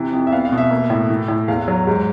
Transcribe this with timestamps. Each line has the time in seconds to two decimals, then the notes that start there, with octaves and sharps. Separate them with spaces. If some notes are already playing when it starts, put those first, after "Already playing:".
Already playing: C3 E3
0.13 F2
0.27 E5
0.32 B3 F5
0.45 F5
0.52 B2
0.58 E5
0.71 A#3
0.90 A2
1.10 E3
1.28 A2
1.48 E2 F5
1.68 F#3
1.87 G#2